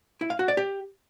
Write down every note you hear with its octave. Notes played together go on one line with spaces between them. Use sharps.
E4
F5
F#4
D5
G4